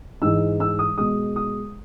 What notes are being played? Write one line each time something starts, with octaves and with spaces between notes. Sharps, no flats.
G#2 E3 G#3 E6
E6
D#6
B2 G#3 D#6
D#6